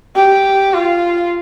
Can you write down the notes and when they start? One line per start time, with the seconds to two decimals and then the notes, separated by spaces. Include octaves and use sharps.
0.15 G4
0.74 F4